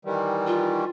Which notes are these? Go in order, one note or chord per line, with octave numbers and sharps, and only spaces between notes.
D#3 E3 G3
F4